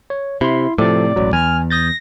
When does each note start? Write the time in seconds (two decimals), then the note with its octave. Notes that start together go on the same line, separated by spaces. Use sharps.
0.10 C#5
0.41 C3 E4 C6
0.78 A2 C3 F3 A4 D5 D6
1.16 E1 A1 F#3
1.33 E2 G#5 F6
1.70 D#6 G6 A6 A#6